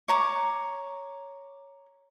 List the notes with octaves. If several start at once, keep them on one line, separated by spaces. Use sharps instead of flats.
C#5 A#5 D6